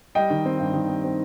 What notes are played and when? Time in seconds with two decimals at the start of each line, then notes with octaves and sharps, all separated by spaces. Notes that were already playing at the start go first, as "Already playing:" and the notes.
0.15 G3 D#5 G5
0.30 D#3
0.46 C4
0.60 G2
0.74 D#3
0.89 C4
1.04 C4